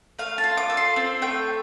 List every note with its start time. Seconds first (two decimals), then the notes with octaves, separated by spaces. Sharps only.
0.19 A3 F5
0.38 A5
0.44 F4
0.57 D6
0.70 A4
0.77 C6
0.96 C4
1.22 A3 G5